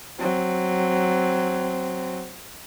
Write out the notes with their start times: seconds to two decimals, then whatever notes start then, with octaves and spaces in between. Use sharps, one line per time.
0.19 F#3 C4